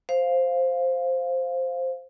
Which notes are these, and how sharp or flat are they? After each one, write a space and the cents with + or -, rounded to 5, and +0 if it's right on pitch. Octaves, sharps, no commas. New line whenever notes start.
C5 +0 F5 +0